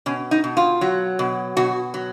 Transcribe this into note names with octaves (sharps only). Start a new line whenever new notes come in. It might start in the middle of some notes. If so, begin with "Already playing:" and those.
B2 C#4
D#4
B2
F4
F#3
B2
B2 F#4
F#3